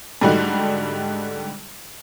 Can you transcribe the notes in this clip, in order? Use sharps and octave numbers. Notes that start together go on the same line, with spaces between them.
G#2 D3 G3 A3 D#4 F#4